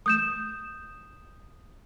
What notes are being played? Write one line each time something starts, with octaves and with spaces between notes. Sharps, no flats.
D#6 G6 E7